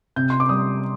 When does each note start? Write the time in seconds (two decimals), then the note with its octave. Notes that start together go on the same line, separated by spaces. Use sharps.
0.16 C3 G6
0.30 C6
0.40 D6
0.49 G3 D#6